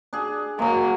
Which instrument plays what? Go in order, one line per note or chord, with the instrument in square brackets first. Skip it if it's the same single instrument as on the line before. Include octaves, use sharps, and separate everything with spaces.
[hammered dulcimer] D4 G#4
[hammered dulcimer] F#3 G#3 [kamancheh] A#3